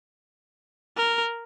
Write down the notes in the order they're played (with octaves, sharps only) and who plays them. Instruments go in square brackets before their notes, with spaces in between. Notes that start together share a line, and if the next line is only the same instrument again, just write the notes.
[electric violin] A#4